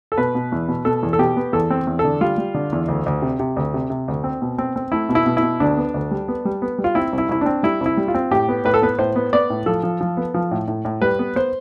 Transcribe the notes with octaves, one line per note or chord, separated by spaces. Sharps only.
A4
B2 B4
B2
E2
B2
B2 A4
E2
A4
B2 G4
B3
E2 A4
C4
E2
A4
D3
G3 F4
G3
D3
E2
D2
D2
C3
C3
D2
C3
C3
D2
C4
B2
C4
C4
A3 E4
B2
E4
B2
E4
B2
D2 D4
B3
D2
G3
B3
G3
B3
G3
F4
C4 E4
C2
E4
C2 E4
C4 D4
G3 E4
C2
E4
G3
F4
C4
A2 G4
B3
A2 B4
A4
B3 B4
A2 C5
B3
B3 D5
A2
F3 A4
F3
F3
B3
F3
A2
A2
A2
G3 B4
B3
B3 C5